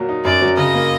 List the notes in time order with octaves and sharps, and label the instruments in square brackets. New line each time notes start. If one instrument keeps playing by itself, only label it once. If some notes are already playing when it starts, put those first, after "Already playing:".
Already playing: [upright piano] A#2 F#3 A#3
D#4
[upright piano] F#2 [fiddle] D5
[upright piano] F#3
[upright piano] C#3 [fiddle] D#5
[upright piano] A#3